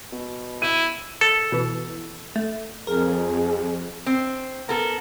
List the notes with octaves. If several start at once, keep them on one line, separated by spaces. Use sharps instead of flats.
B2
E4 D#7
A4
B2 E3
A3
F2 G#4 A#4
C4
B3 A4 A#4